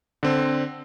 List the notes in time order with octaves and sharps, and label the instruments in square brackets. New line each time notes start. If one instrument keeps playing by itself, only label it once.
[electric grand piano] D3 C4